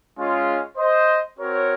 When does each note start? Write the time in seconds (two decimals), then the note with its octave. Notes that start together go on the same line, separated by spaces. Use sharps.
0.18 G#3 C#4 F4
0.77 C5 D#5
1.39 C4 F#4 A#4 C#5